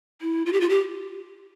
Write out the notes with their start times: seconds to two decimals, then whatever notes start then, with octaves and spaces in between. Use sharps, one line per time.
0.22 E4
0.46 F4
0.53 G4
0.61 F4
0.69 G4